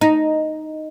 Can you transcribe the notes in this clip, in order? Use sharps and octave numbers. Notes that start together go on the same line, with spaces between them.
D#4